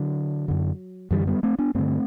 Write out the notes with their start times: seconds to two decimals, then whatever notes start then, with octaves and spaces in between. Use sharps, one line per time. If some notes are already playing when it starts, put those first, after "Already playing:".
Already playing: D3 F#3
0.48 F#2 D3
1.11 F#2 D3 E3 G3
1.27 G3 B3
1.43 A3 C4
1.59 B3 D4
1.75 G2 D3 A3 C4